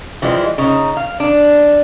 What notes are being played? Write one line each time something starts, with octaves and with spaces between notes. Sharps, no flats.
E3 F3 G3 G#3
C#3 D#4
F5
D4